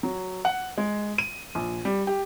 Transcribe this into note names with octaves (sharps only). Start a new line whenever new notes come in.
F#3
F#5
G#3
D#7
A#1
G3
G4